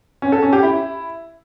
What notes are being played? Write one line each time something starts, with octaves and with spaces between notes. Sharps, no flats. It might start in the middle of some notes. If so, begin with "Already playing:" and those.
C#4
A4
C#4
G4
E4